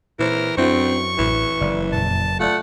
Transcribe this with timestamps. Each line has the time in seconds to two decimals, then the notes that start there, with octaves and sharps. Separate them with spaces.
0.19 A#2 E3 A#4 C5
0.57 F#2 C4 D4 E4 F#4 C#6
1.18 A1 A2 E3
1.61 F#1 D5
1.93 F2 A#2 A5
2.40 A3 F4 D5 F#5